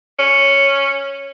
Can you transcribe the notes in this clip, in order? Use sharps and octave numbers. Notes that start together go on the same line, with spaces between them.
C#4